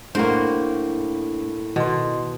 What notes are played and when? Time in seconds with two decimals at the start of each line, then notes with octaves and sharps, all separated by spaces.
0.15 A2 A3 A#3 D4 F#4 C5
1.76 B2 D#3 C6